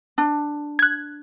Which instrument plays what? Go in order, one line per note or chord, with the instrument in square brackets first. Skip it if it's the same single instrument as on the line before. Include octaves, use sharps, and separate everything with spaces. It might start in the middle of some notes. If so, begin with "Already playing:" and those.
[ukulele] D4
[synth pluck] F#6 G#6